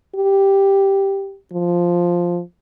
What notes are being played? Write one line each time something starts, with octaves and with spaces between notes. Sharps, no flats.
G4
F3